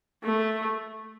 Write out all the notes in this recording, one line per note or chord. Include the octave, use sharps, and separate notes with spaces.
A3